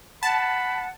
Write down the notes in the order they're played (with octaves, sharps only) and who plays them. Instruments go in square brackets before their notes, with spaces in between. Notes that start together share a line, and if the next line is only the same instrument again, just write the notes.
[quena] F#5 [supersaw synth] A5 [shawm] B5